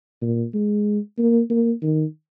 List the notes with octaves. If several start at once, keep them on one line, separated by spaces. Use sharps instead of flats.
A#2
G#3
A#3
A#3
D#3